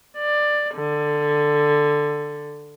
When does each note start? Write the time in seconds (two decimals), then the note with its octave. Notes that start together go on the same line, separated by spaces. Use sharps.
0.18 D5
0.74 D3